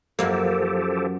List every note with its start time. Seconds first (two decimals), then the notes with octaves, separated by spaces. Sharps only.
0.19 F#2 F3 A#3 G4 A4